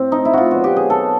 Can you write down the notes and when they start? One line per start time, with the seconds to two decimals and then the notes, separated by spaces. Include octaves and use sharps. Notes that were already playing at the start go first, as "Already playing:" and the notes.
Already playing: A2 C4
0.12 D#4
0.25 E4
0.33 F4 F#4
0.51 B2 F#3 F#4
0.64 G4
0.76 G#4
0.90 A4